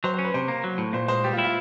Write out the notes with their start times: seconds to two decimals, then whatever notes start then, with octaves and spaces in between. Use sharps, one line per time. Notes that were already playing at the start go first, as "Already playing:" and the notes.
0.04 F#3 C5
0.14 C5
0.19 C#4
0.24 B4
0.34 C3 C5
0.48 A#3
0.64 F#3
0.78 A2
0.93 A#2 C5
1.08 G#3 C5
1.24 G3 G4
1.33 F4
1.38 E4
1.44 F4